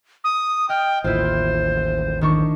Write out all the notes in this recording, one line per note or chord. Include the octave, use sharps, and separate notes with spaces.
D#6
D#5 G5 F6 G6
A1 D#2 E4 F4 C5
D#3 D4 C#6